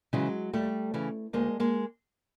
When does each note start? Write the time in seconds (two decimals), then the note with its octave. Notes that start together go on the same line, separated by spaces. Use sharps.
0.13 C#3 E3 F#3 G#3
0.53 D#2 G3 A3
0.94 C#3 E3
1.33 D2 G#3 A#3
1.60 G#3 A#3